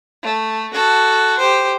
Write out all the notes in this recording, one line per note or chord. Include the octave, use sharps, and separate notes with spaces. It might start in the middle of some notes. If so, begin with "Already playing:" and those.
A3
F#4 A4
G4 C5